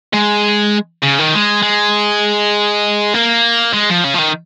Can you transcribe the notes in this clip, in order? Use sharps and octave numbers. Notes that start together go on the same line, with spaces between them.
G#3
C#3
D#3
G#3
G#3
A#3
G#3
F3
C#3
F3
D#3